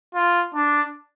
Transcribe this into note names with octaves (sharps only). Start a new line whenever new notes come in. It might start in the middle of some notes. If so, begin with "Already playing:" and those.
F4
D4